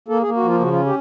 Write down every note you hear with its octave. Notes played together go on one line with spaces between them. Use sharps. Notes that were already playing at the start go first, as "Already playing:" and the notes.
A#3 A4
G#4
A#3
F#4
F3 F4
C#3 F#4
F4
C#4
G4